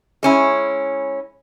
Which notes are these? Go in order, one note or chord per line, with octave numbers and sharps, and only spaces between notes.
G#3 C#4 E4